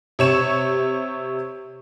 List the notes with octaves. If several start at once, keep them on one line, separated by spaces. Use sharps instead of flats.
C3 C#5 E7